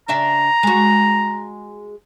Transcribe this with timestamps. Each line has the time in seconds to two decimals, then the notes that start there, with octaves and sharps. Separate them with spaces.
0.08 C#3 D4 E5 A#5
0.63 G#3 F#4